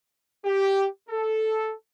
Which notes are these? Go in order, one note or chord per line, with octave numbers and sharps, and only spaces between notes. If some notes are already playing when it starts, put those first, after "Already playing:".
G4
A4